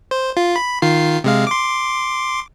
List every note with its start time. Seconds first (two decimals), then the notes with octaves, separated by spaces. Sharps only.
0.11 C5
0.37 F4
0.56 B5
0.82 D#3 F4 C7
1.24 C3 G#3 F5
1.47 C6 D6